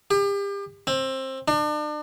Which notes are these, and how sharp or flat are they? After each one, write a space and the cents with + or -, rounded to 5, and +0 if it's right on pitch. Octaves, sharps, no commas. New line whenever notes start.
G4 +35
C4 +20
D4 +40